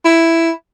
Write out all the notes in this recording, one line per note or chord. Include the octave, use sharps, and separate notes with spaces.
E4